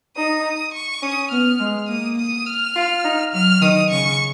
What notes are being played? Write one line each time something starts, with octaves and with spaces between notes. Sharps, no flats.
D#4 D#6
C#6
C#4 D#6
B3 F6
G#3
A#3 D#6
D#6
F6
F4
D#4
F#3 F6
D#3 D#6
C#3 C#6